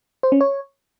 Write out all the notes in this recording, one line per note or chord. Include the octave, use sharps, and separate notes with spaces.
C5
C#4
C#5